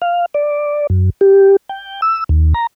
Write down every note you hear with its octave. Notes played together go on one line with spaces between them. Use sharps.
F5
D5
F#2
G4
G5
E6
D#2
A#5